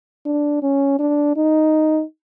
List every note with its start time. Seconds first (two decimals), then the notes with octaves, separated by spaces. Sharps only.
0.26 D4
0.62 C#4
0.99 D4
1.37 D#4